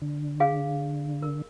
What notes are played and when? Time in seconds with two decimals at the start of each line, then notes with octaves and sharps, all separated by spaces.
0.02 D3
0.40 G#4 F5
1.22 A#4